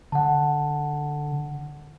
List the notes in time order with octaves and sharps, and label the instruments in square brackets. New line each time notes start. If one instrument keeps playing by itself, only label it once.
[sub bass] D3 [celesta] F#5 A5